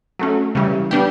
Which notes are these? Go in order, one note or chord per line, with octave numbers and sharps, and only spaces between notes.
F#3 A3 C#4
C#3 E3 G3
G3 B3 D4 G4